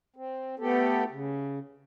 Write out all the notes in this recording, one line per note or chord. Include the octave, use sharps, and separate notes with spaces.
C4
A3 B3 G4 A4
C#3